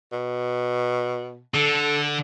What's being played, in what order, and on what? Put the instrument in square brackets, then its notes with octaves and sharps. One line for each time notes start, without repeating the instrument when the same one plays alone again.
[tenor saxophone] B2
[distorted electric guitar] D3 [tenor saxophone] A4